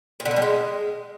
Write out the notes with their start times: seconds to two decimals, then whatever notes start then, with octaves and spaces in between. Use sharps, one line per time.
0.20 A#2
0.25 D3
0.31 B2
0.36 G3
0.42 G#3